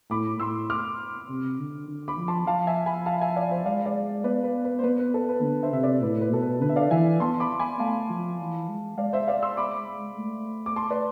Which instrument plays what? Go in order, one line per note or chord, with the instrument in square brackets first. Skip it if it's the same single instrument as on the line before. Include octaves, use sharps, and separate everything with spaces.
[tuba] A2 [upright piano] B5 D6
[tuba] A2 [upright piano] C6 E6
[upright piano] D6 F6
[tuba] C3
D3
D3
[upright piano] B5 D6
[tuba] F3
[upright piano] A5 C6
[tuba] F3 [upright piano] F5 A5
[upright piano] E5 G#5
G#5 B5
F5 A5
E5 G#5
D5 F5
C5 E5
[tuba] G#3 [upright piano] D5 F5
[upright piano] D5 F5
[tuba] B3 [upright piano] B4 D5
[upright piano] B4
B4
C5
[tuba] B3 [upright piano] B4
[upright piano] B4
A4
B4
[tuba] D3
[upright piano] C5 E5
[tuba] C3 [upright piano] E5
[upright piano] B4 D5
[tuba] A2 [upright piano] B4
[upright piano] B4
[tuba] B2 [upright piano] A4
[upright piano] B4
[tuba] D3 [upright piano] B4
[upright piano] E5
D5 F5
[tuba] E3 [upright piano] E5 G#5
[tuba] B3 [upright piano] A5 C6
[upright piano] B5 D6
G#5 B5
[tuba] A3 [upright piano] F5 A5
[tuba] F3
E3
G#3
[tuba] G#3 [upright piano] D5 F5
[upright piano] C5 E5
D5 F5
C6 E6
B5 D6
[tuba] A3
[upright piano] D6
A5 C6
B4 D5